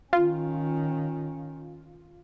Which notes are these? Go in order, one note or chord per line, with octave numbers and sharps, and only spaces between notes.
D#3 C#4 F4